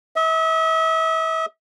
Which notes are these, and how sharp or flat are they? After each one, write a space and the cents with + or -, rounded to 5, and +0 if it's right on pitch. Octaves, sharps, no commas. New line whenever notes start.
E5 -35 D#6 -10